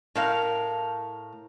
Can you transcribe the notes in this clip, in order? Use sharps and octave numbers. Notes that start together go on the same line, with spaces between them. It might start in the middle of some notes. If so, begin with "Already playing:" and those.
A2 A#4 F5